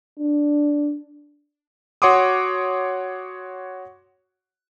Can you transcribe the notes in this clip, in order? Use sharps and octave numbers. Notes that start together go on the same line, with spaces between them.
D4
F#4 C#5 F#5 C6 D6 D#6